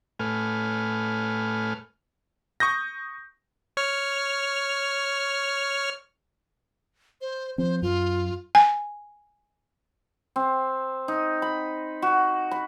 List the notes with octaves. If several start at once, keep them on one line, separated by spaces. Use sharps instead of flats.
A2 A3 B4 G#5 F6
C#6 D#6 G6 A#6
C#5 F6
C5
F3 C4 C5
F#2 F4
G#5
C4
D#4
B5
F#4
B5